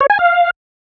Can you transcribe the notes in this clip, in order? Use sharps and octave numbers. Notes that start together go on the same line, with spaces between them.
C#5
G#5
F5